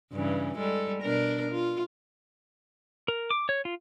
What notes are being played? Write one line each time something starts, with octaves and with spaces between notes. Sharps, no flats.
G2 C#3 E3
G3 G#3 A4
B2 D4 A#4
F4
A#4
D6
C#5
F4